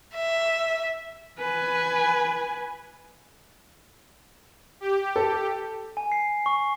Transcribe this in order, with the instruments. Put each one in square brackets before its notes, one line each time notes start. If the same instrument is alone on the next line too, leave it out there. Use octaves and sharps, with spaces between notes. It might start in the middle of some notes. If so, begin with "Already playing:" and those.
[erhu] E5
[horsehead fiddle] B4 G#5
[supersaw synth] G4
[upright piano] A4
[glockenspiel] G#5
C7
C#6